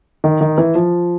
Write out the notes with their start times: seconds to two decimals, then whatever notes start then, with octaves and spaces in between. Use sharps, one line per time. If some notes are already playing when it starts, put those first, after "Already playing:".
0.24 D#3
0.41 D#3
0.58 E3
0.75 F3